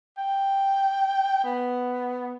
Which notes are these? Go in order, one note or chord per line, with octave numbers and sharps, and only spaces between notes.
G5
B3